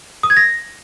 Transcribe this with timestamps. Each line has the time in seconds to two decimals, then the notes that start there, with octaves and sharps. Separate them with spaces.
0.23 D#6
0.30 G#6
0.37 A#6